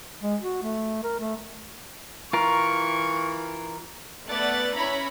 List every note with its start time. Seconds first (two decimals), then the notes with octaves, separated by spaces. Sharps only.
0.22 G#3
0.41 F#4
0.63 A3
1.04 A#4
1.20 A3
2.33 E3 F4 A#4 C#6
4.28 A3 B3 D5 F#6 A6
4.75 C#4 E4 C#5 A#5 B5